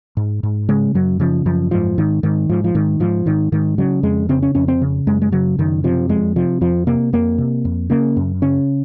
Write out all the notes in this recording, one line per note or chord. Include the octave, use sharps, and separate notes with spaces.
G#2
G#2
C#3 G#3
F#2 F#3
C#3 F3
F#2 F3
G#2 F3
G#2 D#3
G#2 D#3
G#2 F3
F3
G#2 D#3
G#2 F3
G#2 D#3
G#2 D#3
C#3 F#3
F2 G#3
C#3 C4
C#4
F2 C#4
C4
C#3
F#2 G#3
G#3
C#3 F#3
F#2 D#3
C3 F3
F2 G#3
C3 F3
F2 F3
C3 A#3
F2 A#3
C3
F2
C#3 A#3
F#2
C#3 C#4